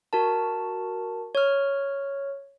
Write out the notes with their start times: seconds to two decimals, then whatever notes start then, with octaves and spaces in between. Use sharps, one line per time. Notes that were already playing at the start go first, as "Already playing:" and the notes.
0.13 F#4 A#4 A5
1.35 C#5 F6